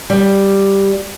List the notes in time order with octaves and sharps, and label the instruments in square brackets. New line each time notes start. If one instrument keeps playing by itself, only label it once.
[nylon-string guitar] G3